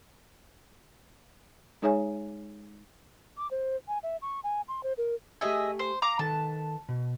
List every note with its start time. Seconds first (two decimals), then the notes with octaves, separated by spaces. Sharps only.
1.82 G#3 D#4 G#4 C#5 E5 G#5
3.37 D6
3.51 C5
3.88 G#5
4.03 E5
4.22 C#6
4.44 G#5
4.68 C6
4.83 C5
4.98 A#4
5.41 A3 G4 G#4 D#5 E5 G#5
5.79 C5
6.02 F5 A#5 D6
6.19 D#3 A4 B4 A5
6.89 B2